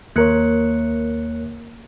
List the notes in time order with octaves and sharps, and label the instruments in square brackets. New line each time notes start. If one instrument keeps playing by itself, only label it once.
[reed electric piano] D#2 A#4 C#5 [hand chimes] A#3 F#6 C#7